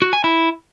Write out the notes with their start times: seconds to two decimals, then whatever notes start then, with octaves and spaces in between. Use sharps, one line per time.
0.02 F#4
0.13 G#5
0.24 E4